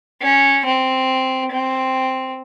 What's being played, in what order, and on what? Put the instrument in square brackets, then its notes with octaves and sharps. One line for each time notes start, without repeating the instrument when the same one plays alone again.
[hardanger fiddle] C#4
C4
C4